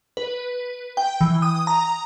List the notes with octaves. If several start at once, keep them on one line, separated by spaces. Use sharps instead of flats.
B4
G5
E3
D#6
A#5